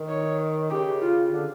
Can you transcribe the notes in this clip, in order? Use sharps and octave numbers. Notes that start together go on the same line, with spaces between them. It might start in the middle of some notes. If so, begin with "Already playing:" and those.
Already playing: D#3
C#5
C#3 G4
F4
D3